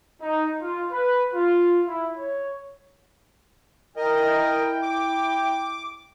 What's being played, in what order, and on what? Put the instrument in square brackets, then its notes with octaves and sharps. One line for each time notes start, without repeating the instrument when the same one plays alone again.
[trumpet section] D#4
F4
B4
F4
E4
C#5
[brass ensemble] E4 G5 [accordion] A#4 D#5
[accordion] D6